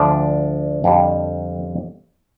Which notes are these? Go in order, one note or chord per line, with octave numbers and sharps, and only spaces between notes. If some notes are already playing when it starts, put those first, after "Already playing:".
Already playing: D2 D3 F3 D4
F2 D3 G3